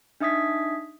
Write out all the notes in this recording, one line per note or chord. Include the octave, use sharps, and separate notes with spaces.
D4 D#4 E5 D#6 G#6 B6